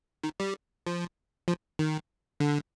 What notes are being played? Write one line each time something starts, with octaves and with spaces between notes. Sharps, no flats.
D#3
G3
F3
F3
D#3
D3